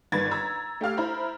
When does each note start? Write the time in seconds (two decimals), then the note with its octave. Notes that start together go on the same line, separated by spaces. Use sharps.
0.12 G1 D#3 B4 G#6 A6
0.31 A#5 E6
0.81 A3 G4 F5 F6
0.98 E4 C5 A#5 B5